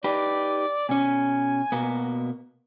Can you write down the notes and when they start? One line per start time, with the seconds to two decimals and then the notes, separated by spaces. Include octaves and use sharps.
0.04 D#4 G4 B4 D5
0.89 B2 C#4 G#5
1.72 B2 A#3 B3